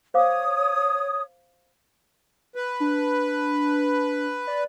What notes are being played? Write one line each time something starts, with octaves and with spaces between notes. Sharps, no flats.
C5 C#5 F5 D6 D#6
B4
D4
D5